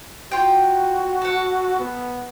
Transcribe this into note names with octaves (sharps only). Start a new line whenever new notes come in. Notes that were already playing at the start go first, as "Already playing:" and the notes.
F4 F#4 G5
A4 F#5
B3